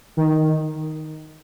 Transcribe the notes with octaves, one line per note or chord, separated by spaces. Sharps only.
D#3